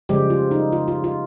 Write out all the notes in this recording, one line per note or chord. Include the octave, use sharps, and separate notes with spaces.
C#3 F3 G3 G#3 G4
F4
D#4
F4
F4
F4